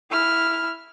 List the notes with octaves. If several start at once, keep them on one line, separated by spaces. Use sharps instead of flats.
E4 F6